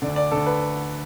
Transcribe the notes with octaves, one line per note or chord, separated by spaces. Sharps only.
D2 D3 D5
D5
D2 D3 A4
B4